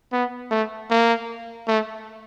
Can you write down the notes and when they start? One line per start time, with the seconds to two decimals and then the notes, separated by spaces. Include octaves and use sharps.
0.12 B3
0.51 A3
0.90 A#3
1.67 A3